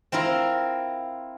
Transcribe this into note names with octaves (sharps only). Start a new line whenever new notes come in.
C4 E4 F4 A#4